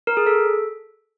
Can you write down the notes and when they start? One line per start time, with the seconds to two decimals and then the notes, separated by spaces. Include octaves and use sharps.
0.07 A#4
0.17 G#4
0.27 A4